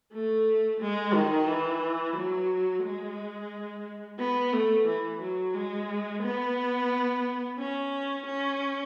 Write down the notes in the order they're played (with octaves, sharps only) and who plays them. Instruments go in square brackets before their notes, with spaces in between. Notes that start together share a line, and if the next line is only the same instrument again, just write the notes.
[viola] A3
G#3
D#3
E3
F#3
G#3
B3
A3
E3
F#3
G#3
B3
C#4
C#4